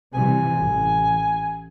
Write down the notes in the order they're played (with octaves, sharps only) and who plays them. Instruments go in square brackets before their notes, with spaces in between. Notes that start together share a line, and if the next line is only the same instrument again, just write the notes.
[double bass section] C3 E3 G3 [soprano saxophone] G#5
[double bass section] A1